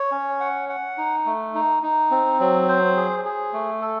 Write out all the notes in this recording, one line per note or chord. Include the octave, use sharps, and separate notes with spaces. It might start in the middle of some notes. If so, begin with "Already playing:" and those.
Already playing: C#5
C#4
F#5
F#5
D#4
A3
D#4
D#4
C4
F#3
C5
G#4
G#4
A3
A4